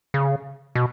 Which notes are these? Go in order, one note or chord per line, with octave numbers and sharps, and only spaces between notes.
C#3
B2